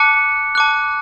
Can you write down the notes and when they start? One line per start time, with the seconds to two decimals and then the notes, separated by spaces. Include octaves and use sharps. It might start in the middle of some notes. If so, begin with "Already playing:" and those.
Already playing: A5 D6 F#6 C#7
0.55 A5 D6 F#6